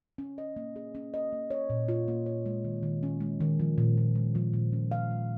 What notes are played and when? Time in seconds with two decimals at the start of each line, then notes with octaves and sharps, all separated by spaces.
0.18 C#4
0.38 D#5
0.56 A#3
0.76 G#4
0.95 C#4
1.14 D#5
1.32 A#3
1.50 C#5
1.70 A#2
1.88 F4
2.08 A#3
2.26 C#5
2.46 G#3
2.64 D#3
2.83 D#3
3.03 C#4
3.21 G#3
3.41 D#3
3.60 F3
3.78 A#2
3.97 A#2
4.15 G#3
4.35 F3
4.53 A#2
4.73 C#4
4.91 F5
5.11 G#3